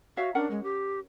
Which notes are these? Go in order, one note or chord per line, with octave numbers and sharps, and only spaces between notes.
F#4 C#5 E5 F5
C#4 D4 A#4 F#5
G#3
G4